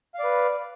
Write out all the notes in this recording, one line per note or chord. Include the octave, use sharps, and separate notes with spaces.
B4 D5 F5